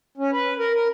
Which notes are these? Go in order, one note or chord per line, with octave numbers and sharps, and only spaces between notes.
C#4
B4
A#4
A#4